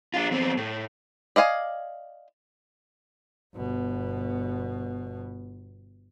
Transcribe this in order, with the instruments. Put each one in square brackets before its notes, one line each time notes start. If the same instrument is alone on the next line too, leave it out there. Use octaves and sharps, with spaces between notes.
[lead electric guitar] D4 F4
E2 C4
A2
[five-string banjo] D5 D#5 F5 G#5
[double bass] G1 B2